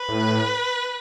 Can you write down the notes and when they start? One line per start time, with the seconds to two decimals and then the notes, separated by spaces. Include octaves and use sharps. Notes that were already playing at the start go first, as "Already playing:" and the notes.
Already playing: B4
0.09 A2